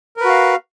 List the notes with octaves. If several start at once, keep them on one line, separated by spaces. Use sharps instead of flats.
F#4 A#4 B4 F5